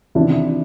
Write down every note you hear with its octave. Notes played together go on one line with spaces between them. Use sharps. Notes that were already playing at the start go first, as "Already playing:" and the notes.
E2 C3 D#3 D4 E4